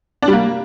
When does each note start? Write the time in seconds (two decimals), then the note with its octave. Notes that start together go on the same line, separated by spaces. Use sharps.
0.22 D4
0.28 G3
0.33 A#3